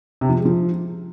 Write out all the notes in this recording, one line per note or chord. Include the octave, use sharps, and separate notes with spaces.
C3
F3
G#3
F3